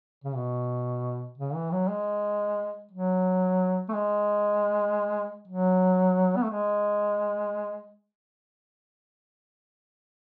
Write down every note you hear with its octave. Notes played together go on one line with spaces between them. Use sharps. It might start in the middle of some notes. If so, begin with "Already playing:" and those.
C#3
B2
C#3
E3
F#3
G#3
F#3
A3
G#3
F#3
B3
A3
G#3